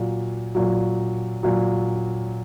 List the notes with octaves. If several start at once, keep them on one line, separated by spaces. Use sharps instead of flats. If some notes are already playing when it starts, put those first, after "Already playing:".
Already playing: A#2 F#3
A#2 F#3
A#2 F#3